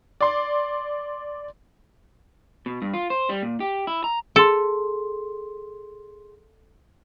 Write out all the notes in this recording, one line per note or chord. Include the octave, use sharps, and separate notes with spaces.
D5 C6
B2
G2
F4
C5
G3
A#2
G4
E4
A#5
G#4 A4 C6